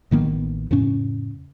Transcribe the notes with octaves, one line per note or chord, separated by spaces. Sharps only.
A1 D#3 A#3 B3
F2 A2 C#3 C#4